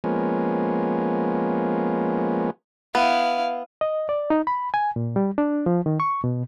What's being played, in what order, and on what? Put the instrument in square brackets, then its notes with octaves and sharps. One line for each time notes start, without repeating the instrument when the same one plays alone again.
[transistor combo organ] F3 G#3 A#3 B3 C#4
[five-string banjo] B3 [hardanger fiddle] E4 F5
[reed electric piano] D#5
D5
D#4
B5
G#5
A#2
G3
D4
F3
D#3
C#6
B2